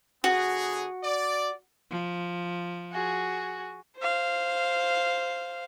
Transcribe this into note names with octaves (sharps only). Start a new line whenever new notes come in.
D3 B3 F#4 G#4
D5
F3
F#4 G#4
C5 F5